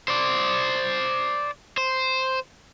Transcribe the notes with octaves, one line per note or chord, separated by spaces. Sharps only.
C5 D5
C5